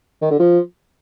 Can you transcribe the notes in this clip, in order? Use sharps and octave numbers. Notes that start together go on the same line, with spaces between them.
D#3
D3
F3